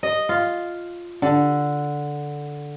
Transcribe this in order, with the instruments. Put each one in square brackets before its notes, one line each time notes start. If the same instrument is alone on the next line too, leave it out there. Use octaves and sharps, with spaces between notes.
[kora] D#5
F4
D3